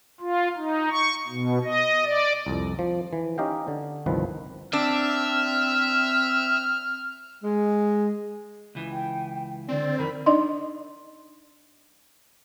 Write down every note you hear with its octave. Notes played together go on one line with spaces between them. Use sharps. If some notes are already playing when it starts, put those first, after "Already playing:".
F4
D#4
C#6
B2
D#5
D5
C2 F2
F3
E3
C#4 D#4 G4 D#5 F5 G5
D3
G1 C2 D#3 F3 B4
C4 D4 E5 F6
G#3
C#2 E3
G5
D3 C4 D5
F2 D#3 A#4 B5
D4 D#4 D5 D#5 C6